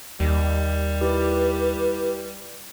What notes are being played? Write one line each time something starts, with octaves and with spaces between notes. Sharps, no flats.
D#2 G3
E4 G4 B4 D6